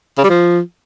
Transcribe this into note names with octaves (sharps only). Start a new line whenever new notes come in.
C#3
G3
F3